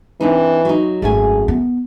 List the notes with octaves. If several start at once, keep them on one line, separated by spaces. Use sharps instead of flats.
E3 C4 D4 D#4
F#3 D#4
G#1 F#2 A3 G#4 G#5
B3